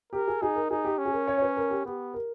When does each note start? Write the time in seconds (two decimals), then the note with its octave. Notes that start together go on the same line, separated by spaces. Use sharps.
0.13 G4 A#4
0.28 G#4
0.42 D#4 G#4
0.56 A#4
0.71 D#4 G#4
0.85 G4
0.98 C#4
1.06 G#4
1.13 A#4
1.28 C#5
1.38 C#5
1.42 B4
1.57 A#4
1.70 G4
1.85 B3 G4
2.14 A#4